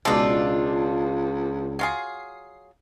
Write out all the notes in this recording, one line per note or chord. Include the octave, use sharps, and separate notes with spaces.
C#2 B2 G#3 D4 D#4 F4 A4 D6
F#3 F4 G#4 C7